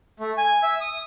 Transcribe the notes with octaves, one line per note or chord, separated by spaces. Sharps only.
A3
G#5
E5
D#6